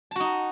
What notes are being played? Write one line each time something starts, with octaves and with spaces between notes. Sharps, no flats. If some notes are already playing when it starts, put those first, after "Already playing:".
D#4 F#4 A5